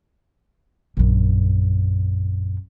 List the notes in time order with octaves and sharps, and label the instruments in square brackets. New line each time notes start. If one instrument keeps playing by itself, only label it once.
[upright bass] A#1 F#2